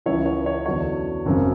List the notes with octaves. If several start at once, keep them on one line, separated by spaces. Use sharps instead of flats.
C#2 C#3 E3 C#5 E5
C#5
C#5
E2 D3 F#3 C#5
G#1 F#2 C#3